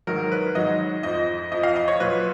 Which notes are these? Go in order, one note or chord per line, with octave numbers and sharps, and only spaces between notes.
G#2 D#3 F#3 A#4
B4
G#2 D#3 F#3 D#5
F2 F3 D#5
F2 F3 D#5
F5
D#5
C#5
A#2 F#3 B4